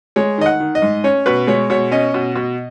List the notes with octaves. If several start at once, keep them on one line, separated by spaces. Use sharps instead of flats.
G#3 C#5
D#3 D#5
F#5
D#3
D#5
G#2
C#4 C#5
B2 B4
G#3 C#5
B2 C#5
C#4 D#5
B2
B2